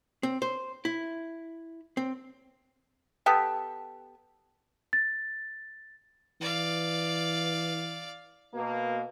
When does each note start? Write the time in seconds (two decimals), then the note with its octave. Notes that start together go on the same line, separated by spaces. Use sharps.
0.23 C4
0.42 C5
0.85 E4
1.97 C4
3.26 B3 G4 A4
4.93 A6
6.41 E3 D5 F5
8.53 B2 A#3